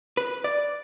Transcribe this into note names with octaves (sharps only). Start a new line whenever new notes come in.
B4
D5